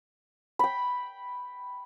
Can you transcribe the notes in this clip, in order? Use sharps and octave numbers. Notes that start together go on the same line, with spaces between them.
G5 B5